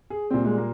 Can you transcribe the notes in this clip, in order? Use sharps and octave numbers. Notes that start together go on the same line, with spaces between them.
G#4
A#2 G3 C4
G#3
A#3